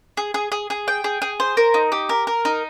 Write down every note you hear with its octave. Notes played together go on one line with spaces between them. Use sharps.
G#4
G#4
G#4
G#4
G5
G#4
G#4
C5
A#4
D#4
G4
A#4
A#4
D#4